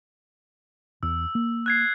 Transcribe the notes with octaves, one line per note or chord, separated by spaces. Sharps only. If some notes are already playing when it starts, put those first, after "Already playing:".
E2 E6
A#3
F#6 G#6 C7